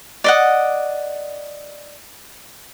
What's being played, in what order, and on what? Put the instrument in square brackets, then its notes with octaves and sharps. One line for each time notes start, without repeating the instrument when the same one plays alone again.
[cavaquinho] D5 D#5 F#5